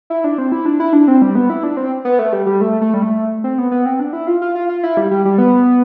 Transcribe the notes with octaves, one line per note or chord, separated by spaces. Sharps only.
E4
D4
C4
E4
D4
E4
D4
C4
G3
B3
E4
D4
C4
B3
A3
G3
G3
A3
A3
G3
A3
C4
B3
B3
C4
D4
E4
F4
F4
F4
F4
E4
G3
G3
G3
B3